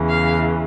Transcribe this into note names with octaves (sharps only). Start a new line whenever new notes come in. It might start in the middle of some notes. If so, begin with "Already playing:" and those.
Already playing: E2 C#3 E3
F5